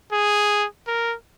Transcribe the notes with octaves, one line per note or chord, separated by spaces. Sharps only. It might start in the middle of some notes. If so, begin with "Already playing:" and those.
G#4
A#4